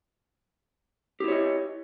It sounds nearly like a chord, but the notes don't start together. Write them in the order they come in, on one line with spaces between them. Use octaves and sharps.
G4 E4 C#5 D#5